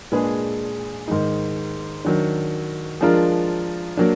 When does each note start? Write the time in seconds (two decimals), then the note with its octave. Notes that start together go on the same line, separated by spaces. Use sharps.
0.12 A#2 G#3 D4 G#4 B4
1.08 G#2 D#3 G#3 D#4
2.05 D#3 F#3 D4
3.01 F3 G#3 D4 F4 A#4
3.97 F#3 A#3 D4